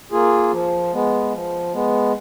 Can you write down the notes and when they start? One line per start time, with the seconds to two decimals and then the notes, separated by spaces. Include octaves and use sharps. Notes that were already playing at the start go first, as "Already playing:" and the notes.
0.11 A#3 F4 G#4
0.52 F3
0.93 G#3 B3
1.33 F3
1.73 G#3 B3